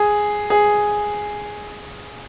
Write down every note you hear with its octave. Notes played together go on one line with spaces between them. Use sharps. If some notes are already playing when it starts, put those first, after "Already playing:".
Already playing: G#4
G#4